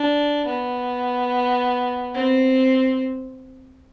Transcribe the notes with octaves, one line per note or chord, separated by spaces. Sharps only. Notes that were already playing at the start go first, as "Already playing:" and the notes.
Already playing: D4
B3
C4